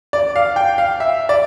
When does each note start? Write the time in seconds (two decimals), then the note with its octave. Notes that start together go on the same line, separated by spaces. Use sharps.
0.13 D5
0.36 F5
0.56 G5
0.78 F5
1.00 E5
1.29 D5